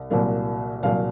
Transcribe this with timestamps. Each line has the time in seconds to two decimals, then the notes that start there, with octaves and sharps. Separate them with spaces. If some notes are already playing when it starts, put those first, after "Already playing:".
Already playing: C2
0.10 C2 A#2 F#3 A#3
0.83 C2 A#2 F#3 A#3 F5